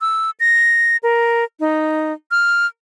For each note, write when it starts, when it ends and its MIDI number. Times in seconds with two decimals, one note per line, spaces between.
0.01 0.30 88
0.40 0.97 94
1.03 1.44 70
1.60 2.13 63
2.31 2.66 89